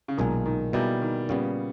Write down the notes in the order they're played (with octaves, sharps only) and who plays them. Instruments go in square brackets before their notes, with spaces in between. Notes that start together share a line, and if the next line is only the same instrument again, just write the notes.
[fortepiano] C#3
[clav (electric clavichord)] B1 A#2 G#3 D#4 G#4 [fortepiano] D#3
[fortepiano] D#3
[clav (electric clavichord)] B2 A#3 E4 G#4 [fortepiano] G3
[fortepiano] D#3
[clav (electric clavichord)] A#2 G3 B3 [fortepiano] C#3